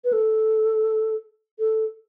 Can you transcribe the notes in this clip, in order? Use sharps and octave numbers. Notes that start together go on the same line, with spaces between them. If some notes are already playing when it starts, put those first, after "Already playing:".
B4
A4
A4